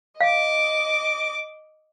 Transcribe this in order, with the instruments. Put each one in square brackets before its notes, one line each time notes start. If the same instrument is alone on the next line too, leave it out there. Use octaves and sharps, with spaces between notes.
[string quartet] D#5 D6 [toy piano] F5